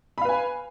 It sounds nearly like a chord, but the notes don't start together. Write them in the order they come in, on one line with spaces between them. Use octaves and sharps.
B5 F5 B4 G#5